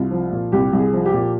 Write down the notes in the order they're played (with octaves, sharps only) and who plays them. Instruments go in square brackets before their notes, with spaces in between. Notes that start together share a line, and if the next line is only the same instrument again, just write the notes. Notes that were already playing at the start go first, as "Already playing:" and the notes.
Already playing: [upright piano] C2 F4
F3
A#2
C2 G4
C2
G#4
F3
G4
A#2